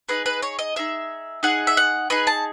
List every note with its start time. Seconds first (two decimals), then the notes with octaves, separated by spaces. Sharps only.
0.09 D#4 G#4 B4
0.26 B4
0.42 C#5
0.59 D#5
0.76 D#4 G#4 E5
1.43 D#4 G#4 F#5
1.67 E5
1.77 F#5
2.10 D#4 G#4 B4
2.27 A5